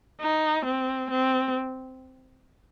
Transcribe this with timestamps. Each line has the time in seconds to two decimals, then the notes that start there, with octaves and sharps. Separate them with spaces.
0.21 D#4
0.66 C4
1.11 C4